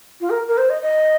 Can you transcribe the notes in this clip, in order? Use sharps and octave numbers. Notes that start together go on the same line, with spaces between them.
F4
A#4
A#4
C5
D#5
D#5